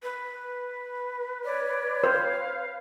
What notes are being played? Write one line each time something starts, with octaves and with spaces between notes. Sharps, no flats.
B4
C#5 D5
C5 F5